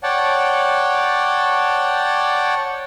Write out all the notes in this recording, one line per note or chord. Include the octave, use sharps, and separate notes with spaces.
C#5 D5 F#5 G5 A5